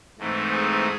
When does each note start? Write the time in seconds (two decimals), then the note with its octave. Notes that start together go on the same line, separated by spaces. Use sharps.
0.19 G#2 E3 A3 C4 D#4
0.53 G#4